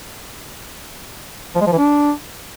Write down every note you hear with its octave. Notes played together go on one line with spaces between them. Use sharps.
F3
G#3
F3
E3
D4